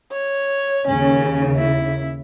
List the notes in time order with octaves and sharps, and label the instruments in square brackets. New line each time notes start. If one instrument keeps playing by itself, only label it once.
[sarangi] C#5
[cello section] D#2 C#3 [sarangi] C#4
[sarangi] E4